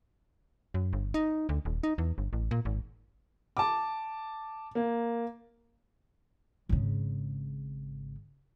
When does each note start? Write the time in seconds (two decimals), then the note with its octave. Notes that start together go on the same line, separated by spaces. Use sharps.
0.74 F#2
0.93 G1
1.14 D#4
1.49 D2
1.65 D#1
1.83 D#4
1.98 E2
2.18 G1
2.33 A1
2.51 A#2
2.65 G#1
3.57 A5 D6
4.75 A#3
6.69 G#1 C#3